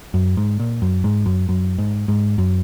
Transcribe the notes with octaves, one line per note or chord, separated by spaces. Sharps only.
F#2
G#2
A#2
F#2
G#2
F#2
F#2
G#2
G#2
F#2